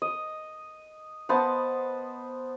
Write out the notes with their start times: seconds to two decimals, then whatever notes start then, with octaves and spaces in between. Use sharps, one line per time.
0.02 D#5
1.29 B3 C5 D#5 A5